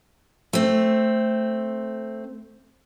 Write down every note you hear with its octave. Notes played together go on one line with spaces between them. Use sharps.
A3 C4